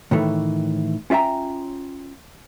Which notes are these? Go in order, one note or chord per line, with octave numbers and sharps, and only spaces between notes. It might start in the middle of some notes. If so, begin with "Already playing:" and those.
A2 D#3 E3 A3
C#4 F4 E5 G5 A#5